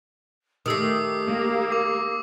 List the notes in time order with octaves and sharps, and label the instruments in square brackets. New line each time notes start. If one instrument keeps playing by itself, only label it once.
[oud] D#3 A3 [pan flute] G4 [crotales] D#6 E6 C7
[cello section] A#3
[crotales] D6